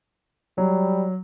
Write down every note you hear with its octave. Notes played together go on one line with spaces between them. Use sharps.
F#3 G3